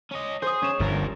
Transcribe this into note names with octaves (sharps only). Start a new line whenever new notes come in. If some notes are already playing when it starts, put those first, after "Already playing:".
C#4 D#5
G#4 C5 D#6
C#4 E7
G1 G2 F3 A#4